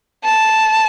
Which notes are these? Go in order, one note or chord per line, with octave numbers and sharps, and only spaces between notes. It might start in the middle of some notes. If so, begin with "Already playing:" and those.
A5